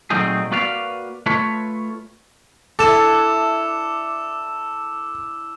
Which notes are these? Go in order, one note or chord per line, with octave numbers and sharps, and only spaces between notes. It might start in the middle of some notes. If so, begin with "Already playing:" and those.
A#2 F#3 A3 C4 D#4 G#4
A#3 F#4 B4 D5 F5
A3 F4 B4 C#5
D4 E4 A4 D6 E6 E7